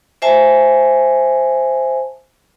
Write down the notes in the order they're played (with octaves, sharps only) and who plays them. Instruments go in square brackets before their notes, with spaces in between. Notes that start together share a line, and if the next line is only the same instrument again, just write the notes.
[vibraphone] C5 E5 G#5 A5